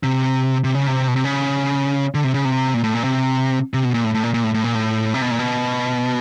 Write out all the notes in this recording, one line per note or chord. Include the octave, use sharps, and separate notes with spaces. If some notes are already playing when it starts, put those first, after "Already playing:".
C3
C3
C#3
C3
B2
C3
C#3
D3
C3
C#3
C3
A#2
A2
A#2
C3
C3
B2
A#2
A2
A2
A#2
A#2
A2
A2
A#2
A2
C3
B2
A#2
B2